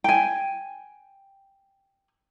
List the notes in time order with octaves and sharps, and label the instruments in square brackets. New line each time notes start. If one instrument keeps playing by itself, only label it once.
[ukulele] G5 G#5